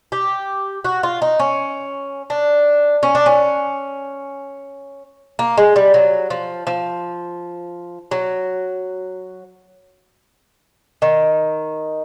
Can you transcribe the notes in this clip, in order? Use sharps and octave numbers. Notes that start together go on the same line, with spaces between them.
G4
F#4
F4
D#4
C#4
D4
C#4
D4
C#4
A#3
G#3
G3
F#3
F3
F3
F#3
D#3